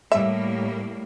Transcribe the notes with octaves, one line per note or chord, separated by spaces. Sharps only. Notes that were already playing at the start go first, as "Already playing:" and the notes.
A2 G3 A#3 E5